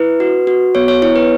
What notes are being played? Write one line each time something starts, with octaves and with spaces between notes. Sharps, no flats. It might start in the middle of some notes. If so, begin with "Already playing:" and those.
Already playing: E4 B4
F#4
F#4
B3 C#5
C#5
E4 C#5
B4